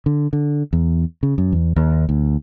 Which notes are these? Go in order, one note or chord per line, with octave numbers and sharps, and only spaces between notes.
D3
D3
E2
C#3
F#2
E2
D#2
D2